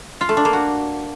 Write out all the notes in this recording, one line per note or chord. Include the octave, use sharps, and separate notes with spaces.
F4
A3
D4
A#3
F#4